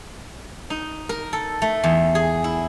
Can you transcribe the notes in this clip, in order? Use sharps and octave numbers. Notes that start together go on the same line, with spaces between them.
D#4
A#4
A4
A3
E2
G#4
E4